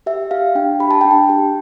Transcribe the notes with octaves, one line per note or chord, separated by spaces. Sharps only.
G4 E5
G4 F5
D4 G5
G4 B5
A5
D4 G5
A5
G4